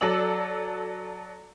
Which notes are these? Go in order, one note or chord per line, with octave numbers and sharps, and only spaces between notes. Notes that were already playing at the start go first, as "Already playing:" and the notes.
F#3 A4 D5 E6 F#7